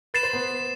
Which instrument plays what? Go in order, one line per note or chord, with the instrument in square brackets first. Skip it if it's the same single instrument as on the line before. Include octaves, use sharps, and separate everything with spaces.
[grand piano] B4 [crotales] A6 C7 E7
[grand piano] C5
B3 B4